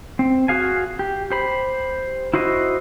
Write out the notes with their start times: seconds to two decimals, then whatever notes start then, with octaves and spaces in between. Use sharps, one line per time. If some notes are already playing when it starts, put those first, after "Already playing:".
0.19 C4
0.48 F#4 G#4 F5 G#5
0.99 G4
1.30 G4 C5 B5
2.34 E4 F#4 C5 D#5